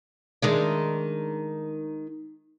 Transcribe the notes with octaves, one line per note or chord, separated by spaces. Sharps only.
D#3 G#3 D4